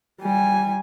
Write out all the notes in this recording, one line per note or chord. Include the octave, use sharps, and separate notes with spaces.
G3 G#5